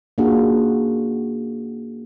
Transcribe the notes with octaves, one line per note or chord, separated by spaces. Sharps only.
A#3 C#4 D4 F4 F#4 G#4